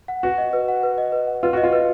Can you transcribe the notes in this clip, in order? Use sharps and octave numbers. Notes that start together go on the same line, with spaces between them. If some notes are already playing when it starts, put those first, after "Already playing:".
F#5
F#4 B4
D#5
B4
F#5
B4
D#5
B4
F#5
F4 B4
F#4 D#5
F4
B4